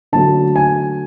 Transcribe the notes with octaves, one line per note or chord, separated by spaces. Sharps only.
D3 F#3 A3 A5
G#5